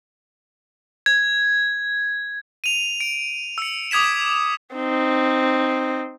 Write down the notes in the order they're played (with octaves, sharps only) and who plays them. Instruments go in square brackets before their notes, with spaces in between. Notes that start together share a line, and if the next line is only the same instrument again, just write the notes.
[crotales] G#6
D#7 F7
D7
E6 C#7
D6 D#6 G#6 B6 E7
[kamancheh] C4 D#4